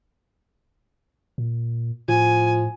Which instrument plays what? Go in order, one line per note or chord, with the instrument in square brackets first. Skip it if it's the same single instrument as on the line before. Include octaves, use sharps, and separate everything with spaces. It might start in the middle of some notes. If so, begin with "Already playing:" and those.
[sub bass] A#2
[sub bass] A2 [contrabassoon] F3 [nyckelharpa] G#5